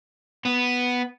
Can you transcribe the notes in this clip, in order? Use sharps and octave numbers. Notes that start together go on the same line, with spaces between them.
B3